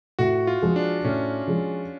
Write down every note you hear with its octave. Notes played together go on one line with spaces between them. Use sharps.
A2 F#4
F4
F3 G#3
D4
A2 C#4
F3 G#3